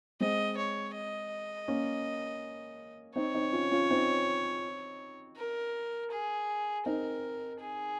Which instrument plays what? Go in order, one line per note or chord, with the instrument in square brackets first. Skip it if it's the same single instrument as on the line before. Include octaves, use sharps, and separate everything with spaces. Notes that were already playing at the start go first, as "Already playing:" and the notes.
[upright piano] G#3 C4 [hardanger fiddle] D#5
[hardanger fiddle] C#5
D#5
[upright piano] A#3 C#4
[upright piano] C4 D#4 [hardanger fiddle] C#5
[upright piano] C4 D#4
C#4 F4
C#4 F4
C4 D#4
[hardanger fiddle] A#4
G#4
[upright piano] C4 D#4 [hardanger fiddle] A#4
[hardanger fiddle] G#4